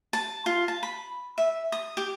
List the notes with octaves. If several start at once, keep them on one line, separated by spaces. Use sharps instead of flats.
A5
F4
A5
B5
E5
D#6
G4